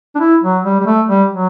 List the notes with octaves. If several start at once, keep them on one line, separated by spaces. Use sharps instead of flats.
D4
E4
F#3
G3
G3
A3
G3
F#3